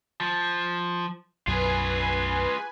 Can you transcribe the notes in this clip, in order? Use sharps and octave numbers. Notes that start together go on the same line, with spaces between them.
F3
B1 F#2 F4 G#4 B4 G#5